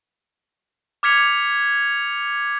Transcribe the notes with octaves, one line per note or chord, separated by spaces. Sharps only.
D6 F6 G#6 B6 C#7 F7